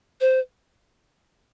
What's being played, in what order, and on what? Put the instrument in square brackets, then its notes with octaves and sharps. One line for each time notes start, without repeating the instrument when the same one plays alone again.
[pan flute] C5